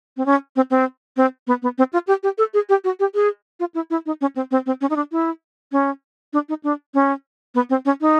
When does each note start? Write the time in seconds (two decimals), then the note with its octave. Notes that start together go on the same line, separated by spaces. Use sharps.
0.17 C4
0.26 C#4
0.56 C4
0.71 C4
1.17 C4
1.47 B3
1.62 B3
1.78 C4
1.93 F4
2.07 G4
2.23 G4
2.38 A4
2.54 G#4
2.69 G4
2.84 F#4
3.00 G4
3.15 G#4
3.60 F4
3.74 E4
3.90 E4
4.06 D#4
4.21 C#4
4.36 C4
4.51 C4
4.66 C4
4.81 C#4
4.90 D#4
4.96 D4
5.12 E4
5.72 C#4
6.33 D4
6.49 D#4
6.63 D4
6.94 C#4
7.55 B3
7.70 C4
7.85 C#4
8.01 D#4